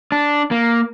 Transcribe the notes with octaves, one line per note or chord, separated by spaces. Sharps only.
D4
A#3